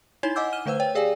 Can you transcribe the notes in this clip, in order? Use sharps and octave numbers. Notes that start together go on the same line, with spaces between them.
D#4 E4 C#5 G#5 E7 G7
D#5 F#5 G#5 D6 E6 G6
F6 D#7 E7 G7
D3 A3 B4 C5 E6
C#5 G5
G4 G#4 D5 F5 G5 G#5